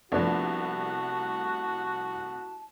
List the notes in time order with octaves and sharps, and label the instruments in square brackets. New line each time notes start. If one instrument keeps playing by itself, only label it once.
[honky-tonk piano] C2 A3 [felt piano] F3 B3 D4 [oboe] F#4 [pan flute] A5